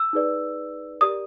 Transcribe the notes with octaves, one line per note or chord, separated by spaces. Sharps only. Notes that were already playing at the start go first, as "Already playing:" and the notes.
Already playing: E6
D#4 G#4 B4 D5
G4 A#4 D5 D#6